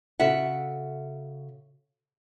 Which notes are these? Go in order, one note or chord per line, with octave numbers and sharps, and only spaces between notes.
C#3 F#4 A4 E5 F#5